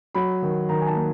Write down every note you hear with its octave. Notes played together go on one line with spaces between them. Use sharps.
F#3 B5
D#3
D#3 A#5
G#5
A5
A#3